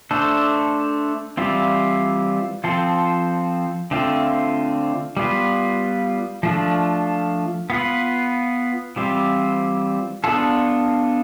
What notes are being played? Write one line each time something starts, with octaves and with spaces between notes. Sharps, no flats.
A3 D4 A4 C5
E3 G3 C4 F4
F3 C4 F4 A4 C5
D3 A3 C4 F4
G3 B3 F4 B4
F3 A3 D4 F4
B3 F4 B4
E3 G3 C4 F4
B3 D4 F4 A4